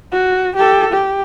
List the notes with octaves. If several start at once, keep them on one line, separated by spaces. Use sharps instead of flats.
F#4
G4 A4
G4